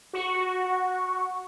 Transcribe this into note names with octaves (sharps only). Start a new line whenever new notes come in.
F#4 C#6